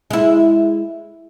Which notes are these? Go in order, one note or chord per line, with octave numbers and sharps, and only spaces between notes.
G#3 E4